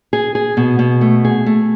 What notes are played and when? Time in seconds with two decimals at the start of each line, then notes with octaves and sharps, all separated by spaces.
0.13 G#4
0.35 G#4
0.57 B2
0.79 B2
1.01 A3
1.25 G#4
1.46 A3